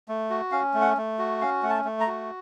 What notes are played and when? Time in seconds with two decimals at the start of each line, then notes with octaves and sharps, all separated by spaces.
0.08 A3
0.30 F#4
0.52 C#4 F5
0.74 A3
0.81 F#5
0.97 A3
1.19 F#4
1.41 C#4 F5
1.63 A3 F#5
1.70 A5
1.85 A3
2.00 A#5
2.07 F#4